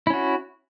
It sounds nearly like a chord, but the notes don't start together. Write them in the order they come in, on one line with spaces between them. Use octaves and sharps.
E4 C#4 F#4